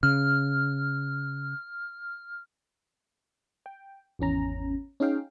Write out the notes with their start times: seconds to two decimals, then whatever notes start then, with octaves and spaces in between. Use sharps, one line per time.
0.03 C#3 F6
3.66 G5
4.19 G#1 E2 C#4 A#5
5.00 C#4 D#4 G#4 F5 G5